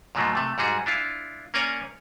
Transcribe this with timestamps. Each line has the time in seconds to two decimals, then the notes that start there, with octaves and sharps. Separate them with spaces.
0.15 G#2 B2 F3 F#3 A3 A#3
0.35 C3 A3
0.58 G#2 G3 F#4 G#4
0.86 D4 E4 F4
1.54 A#3 C#4 C#5 D5 G#5 A#5